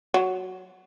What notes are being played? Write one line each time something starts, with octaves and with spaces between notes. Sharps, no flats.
F#3